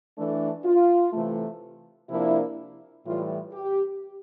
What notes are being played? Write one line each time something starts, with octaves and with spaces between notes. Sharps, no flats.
E3 A3 D4 A4
F4
C3 E3 A3
C3 F3 A#3 D4 E4
A2 E3 G3 F4
G4